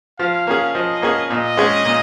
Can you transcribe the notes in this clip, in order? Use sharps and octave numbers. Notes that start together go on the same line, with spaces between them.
F3 F5
A#3 C#4 G#4
F3 D#5
A#3 C#4 G#4
A#2 D#5
G#3 C#4 G#4
A#2